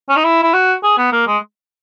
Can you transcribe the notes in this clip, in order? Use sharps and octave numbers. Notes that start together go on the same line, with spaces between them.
C#4
D#4
E4
E4
F#4
G#4
B3
A#3
G#3